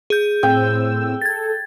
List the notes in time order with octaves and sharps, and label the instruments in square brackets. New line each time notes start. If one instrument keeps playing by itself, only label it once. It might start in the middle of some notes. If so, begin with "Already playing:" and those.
[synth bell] G#4 G6
[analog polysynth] A2 C4 E6 [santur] G5
[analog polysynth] A4 [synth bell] G#6 A6